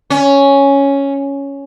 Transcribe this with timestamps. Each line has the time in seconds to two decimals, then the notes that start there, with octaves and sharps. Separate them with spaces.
0.10 C#4